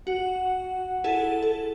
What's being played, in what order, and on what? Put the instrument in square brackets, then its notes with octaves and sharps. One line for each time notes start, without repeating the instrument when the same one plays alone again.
[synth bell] F#4 [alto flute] F#5
[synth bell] E4 G#4 A4
A4